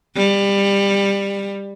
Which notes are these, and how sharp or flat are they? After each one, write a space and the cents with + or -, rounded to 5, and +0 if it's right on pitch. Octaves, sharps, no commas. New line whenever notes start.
G3 +20